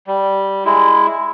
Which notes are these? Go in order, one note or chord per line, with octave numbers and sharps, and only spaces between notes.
G3
G#3 E4